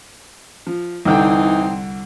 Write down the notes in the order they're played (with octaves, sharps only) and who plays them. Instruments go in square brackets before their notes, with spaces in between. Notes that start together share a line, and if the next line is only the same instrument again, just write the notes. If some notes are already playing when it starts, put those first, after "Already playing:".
[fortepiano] F3
[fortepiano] C2 D3 G5 [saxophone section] E3 C4 D#4